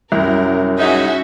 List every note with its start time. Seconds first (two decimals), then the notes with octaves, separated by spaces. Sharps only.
0.12 C2 F#2 A#4
0.79 G#3 C#4 D#4 F#4 E5